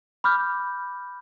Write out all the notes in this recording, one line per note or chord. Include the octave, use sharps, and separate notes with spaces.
B5 D6 F6 G6